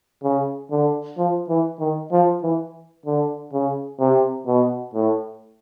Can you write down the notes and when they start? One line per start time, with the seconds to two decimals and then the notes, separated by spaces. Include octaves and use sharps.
0.23 C#3
0.71 D3
1.18 F3
1.49 E3
1.80 D#3
2.12 F3
2.43 E3
3.06 D3
3.53 C#3
4.00 C3
4.47 B2
4.94 A2